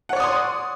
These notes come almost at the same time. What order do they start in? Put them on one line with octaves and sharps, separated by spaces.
F#5 C#5 D5 D#6 C6